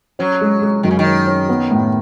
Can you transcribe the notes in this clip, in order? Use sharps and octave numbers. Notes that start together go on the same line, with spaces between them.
F#3 C#4
G#3
G#3
F#2 D#3
C#3
D#3
C#4
C#4
B3
A2